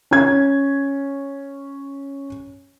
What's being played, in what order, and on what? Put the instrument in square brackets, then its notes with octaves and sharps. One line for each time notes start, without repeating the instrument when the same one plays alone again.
[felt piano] C#4 G#6